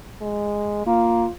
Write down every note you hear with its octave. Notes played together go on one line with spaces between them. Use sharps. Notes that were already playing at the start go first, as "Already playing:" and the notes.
G#3
A#3 F4